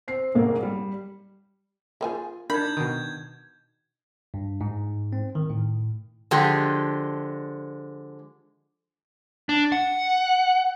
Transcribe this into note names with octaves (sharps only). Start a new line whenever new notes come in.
C4 C7
F1 A#1 G#2 A#3
G3
A#3 F4 G#4 C5 G#5
D4 D#4 A#4 B5 G6 G#6
B2 D#3
G2
G#2
C4
D#3
A2
D3 F3 G#3 G4
D4
F#5